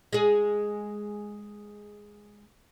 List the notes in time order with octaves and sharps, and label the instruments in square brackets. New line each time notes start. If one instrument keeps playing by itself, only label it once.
[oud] G#3 G#4